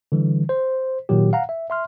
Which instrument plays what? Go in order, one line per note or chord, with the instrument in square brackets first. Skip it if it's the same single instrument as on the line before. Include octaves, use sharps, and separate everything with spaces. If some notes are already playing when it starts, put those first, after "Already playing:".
[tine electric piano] D3 E3 G3
C5
A#2 D#3 F#3 G4
F5 F#5 A#5
E5
E5 C6 F6